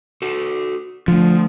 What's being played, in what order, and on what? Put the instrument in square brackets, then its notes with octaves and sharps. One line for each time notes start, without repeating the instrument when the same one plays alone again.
[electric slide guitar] F#4 A4
[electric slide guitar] D3 A3 [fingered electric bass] F3